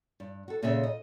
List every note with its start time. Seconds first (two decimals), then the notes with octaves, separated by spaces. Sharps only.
0.20 G2
0.48 F#4 A4
0.62 A#2 C#3 C4 G#4 C#5 E5
0.83 D#5